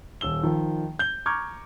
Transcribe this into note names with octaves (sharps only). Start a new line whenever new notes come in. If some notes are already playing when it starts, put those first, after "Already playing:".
D#1 E6 G7
D#3 F3
G6 G7
A#5 C#6 D6 F6 G6 G#6